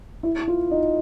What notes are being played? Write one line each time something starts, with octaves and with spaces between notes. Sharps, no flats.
E4
F4
D#4